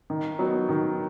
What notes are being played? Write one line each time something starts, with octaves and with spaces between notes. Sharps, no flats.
D#3
F#3 B3 D#4
D#3